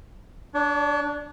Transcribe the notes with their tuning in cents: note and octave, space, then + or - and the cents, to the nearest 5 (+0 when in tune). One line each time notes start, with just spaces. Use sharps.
D4 +0 C#5 +45